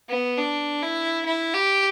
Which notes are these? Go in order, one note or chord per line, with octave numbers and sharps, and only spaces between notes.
B3
D4
E4
E4
G4